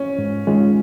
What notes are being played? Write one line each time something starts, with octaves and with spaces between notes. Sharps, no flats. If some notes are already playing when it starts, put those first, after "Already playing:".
Already playing: C#4
G#2
D#3 G#3 C#4 F4